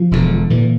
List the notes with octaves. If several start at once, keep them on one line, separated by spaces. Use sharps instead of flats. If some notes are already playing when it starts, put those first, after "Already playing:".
Already playing: F3
E1 D2 D3
A#2 D3 E3